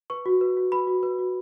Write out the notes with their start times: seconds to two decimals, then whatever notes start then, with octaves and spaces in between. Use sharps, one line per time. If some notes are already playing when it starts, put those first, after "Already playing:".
0.10 B4 C#6
0.26 F#4
0.41 B4
0.57 F#4
0.72 B4 B5
0.87 F#4
1.03 B4
1.19 F#4